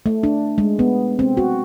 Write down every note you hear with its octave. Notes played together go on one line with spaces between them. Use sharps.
A3
D4
G#3
B3
C4
F#4